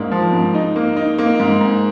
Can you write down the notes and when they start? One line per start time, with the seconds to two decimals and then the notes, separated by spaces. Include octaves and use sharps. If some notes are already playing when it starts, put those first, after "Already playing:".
Already playing: G#2 A#3 D4
0.11 F3
0.33 G#2
0.54 D#4
0.76 A#3
0.96 D#4
1.18 A#3
1.40 G#2
1.61 G#2